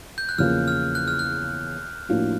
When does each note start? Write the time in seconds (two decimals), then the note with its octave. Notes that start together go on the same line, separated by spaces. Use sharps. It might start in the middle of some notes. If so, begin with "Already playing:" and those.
0.18 G6
0.29 F#6
0.38 E2 C#3 F3 A#3 F6
0.68 F6
0.95 F#6
1.08 F6
1.19 F#6
2.09 A2 F3 A#3 D4 F#4